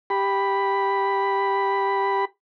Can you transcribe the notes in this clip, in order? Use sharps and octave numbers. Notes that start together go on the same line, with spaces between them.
G4 B5